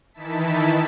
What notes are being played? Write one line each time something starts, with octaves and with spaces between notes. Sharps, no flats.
D#3 E3 D#4 E4 A5 B6